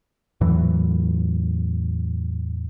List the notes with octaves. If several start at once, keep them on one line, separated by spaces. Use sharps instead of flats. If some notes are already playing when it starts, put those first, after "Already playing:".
E2 A2 E3 F#3